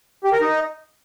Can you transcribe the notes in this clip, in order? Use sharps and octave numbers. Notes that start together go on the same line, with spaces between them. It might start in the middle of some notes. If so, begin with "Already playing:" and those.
G4
A#4
D#4